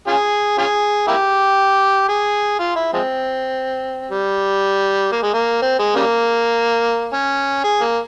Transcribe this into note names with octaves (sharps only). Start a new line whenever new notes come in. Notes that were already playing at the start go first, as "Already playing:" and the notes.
C#4 F4 G#4
C#4 F4 G#4
A#3 E4 G4
G#4
F4
E4
F3 G#3 C4
G3
A#3
G#3
A#3
C4
G#3
C#3 G3 A#3
C#4
G#4
A#3